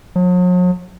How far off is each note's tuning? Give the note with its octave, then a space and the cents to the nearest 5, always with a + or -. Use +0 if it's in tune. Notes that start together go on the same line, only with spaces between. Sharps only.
F#3 -45